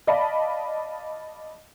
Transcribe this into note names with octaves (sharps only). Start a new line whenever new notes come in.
D5 D#5 F5 A5 B5